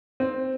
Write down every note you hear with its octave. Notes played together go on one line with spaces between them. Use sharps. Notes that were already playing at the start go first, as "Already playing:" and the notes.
C4